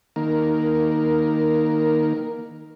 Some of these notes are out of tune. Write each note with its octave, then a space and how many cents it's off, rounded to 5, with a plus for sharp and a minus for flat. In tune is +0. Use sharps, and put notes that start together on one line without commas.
D#3 +0 A#3 +10 A#4 +0